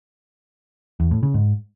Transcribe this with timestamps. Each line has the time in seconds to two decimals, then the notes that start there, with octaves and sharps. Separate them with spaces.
1.00 E2
1.11 A2
1.23 C#3
1.34 G#2